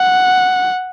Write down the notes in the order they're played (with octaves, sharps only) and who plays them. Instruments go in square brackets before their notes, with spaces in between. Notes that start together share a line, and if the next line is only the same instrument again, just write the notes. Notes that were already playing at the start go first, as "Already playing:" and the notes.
Already playing: [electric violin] F#5